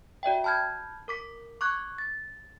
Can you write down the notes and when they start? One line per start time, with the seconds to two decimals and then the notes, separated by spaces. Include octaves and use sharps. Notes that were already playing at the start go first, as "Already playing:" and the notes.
0.23 F#4 D5 E5 G5
0.44 A5 B5 F6 G6 G#6
1.08 A#4 D6 B6
1.61 C#6 D6 F#6 G#6
1.98 A6